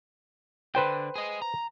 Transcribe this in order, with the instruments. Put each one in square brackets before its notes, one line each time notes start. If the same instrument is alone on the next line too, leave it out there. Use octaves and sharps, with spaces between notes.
[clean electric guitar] D3 [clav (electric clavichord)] B4 C5 G5
[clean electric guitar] G#4 D#5
A#5